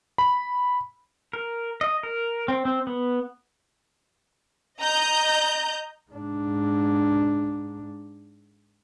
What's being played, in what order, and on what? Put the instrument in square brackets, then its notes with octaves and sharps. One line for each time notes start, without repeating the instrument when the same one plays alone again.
[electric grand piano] B5
[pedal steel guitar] A#4
D#5
A#4
C4
C4
B3
[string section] D#5 A#5 G6
[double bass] G#2 D4